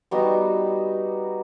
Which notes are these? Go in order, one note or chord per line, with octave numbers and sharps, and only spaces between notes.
G3 B3 D#4 F#4